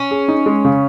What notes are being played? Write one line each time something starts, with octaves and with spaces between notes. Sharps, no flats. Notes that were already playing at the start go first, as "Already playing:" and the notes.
Already playing: C#4
G#4
D#4
G#3
C#3